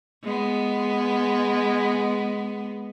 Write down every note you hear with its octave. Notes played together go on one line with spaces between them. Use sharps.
G#3 B3